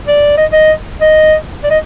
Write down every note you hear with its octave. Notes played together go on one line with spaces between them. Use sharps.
D5
D#5
D#5
D#5
D5
D#5